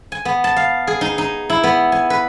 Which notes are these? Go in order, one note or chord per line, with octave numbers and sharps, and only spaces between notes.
G#5
B3
A5
F5
G#4
D#4
D#4
E4
B3
G#5
B4